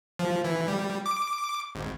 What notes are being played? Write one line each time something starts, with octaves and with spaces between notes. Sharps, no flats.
F3
E3
G3
D6
G#1